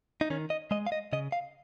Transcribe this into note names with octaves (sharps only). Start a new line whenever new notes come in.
D#4
D#3 C#4
D#5
G#3 D#5
F5
D#5
C#3 D#5
F5